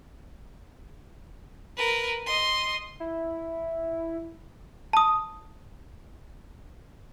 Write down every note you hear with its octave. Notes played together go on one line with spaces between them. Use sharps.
A#4 B4
D#5 C6
E4
A5 D#6